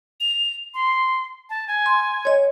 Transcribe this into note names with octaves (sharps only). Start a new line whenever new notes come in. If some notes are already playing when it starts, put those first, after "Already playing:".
F7
C6
A5
G#5
C6
C#5 D#5